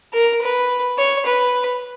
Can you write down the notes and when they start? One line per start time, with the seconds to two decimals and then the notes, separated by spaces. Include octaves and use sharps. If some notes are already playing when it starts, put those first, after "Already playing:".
0.14 A#4
0.41 B4
0.98 C#5
1.26 B4